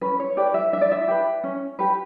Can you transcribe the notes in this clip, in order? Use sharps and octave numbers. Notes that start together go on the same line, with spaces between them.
C#4 B4
C#5
G4 B4 D5
E5
D4 E5
D5
E5
G4 B4
C#4
G4 B4